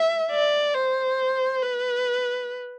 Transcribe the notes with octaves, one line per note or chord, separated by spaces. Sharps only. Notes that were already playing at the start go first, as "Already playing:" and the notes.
Already playing: E5
D5
C5
B4